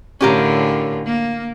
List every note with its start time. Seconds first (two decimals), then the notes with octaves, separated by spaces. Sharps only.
0.21 A2 D3 C#4 F4 G4 A#4
1.06 A#3